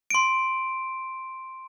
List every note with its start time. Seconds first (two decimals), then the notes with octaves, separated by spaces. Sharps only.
0.10 C6 D7